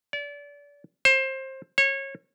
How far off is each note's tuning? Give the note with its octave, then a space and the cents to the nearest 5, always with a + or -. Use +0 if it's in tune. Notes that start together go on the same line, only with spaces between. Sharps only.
D5 -30
C5 +25
C#5 -25